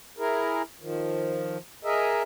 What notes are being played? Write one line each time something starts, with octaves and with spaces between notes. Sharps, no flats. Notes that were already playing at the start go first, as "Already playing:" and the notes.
E4 G#4 A#4
D#3 F3
G#4 A#4 D#5 E5